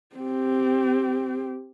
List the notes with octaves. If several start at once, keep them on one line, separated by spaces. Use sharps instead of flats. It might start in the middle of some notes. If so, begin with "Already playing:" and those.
C4 G4